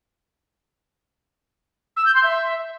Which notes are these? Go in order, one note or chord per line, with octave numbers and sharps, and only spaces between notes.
E6
G6
C6
E5